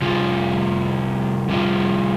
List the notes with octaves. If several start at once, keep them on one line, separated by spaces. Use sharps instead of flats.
C3 G3 F4
C3 G3 F4